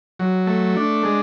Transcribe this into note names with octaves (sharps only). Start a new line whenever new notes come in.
F#3
A3
D4
G#3